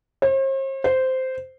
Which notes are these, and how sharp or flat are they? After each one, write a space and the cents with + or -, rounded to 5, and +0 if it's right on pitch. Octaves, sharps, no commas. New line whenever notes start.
C5 +45
C5 -10